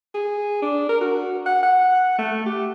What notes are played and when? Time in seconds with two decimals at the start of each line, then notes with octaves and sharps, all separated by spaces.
0.14 G#4
0.62 D4
0.89 A#4
1.01 F#4
1.46 F#5
1.63 F#5
2.18 A3
2.46 G4